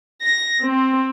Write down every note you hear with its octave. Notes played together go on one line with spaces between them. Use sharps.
A#6
C4